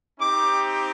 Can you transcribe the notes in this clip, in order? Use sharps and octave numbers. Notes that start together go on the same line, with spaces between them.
C4 D#4 G4 D6